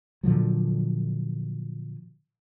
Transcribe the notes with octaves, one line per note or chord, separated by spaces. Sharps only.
A#2 D3 F3 F#3